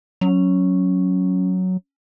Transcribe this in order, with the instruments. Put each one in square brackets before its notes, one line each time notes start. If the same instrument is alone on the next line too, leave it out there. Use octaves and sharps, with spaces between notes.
[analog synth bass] F#3 [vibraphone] C#4